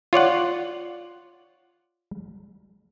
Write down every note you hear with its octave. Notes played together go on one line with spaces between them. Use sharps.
F4 C#5 D5 F#5